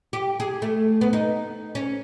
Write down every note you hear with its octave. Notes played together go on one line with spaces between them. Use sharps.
G4
G#4
A3
B3
D#4
C#4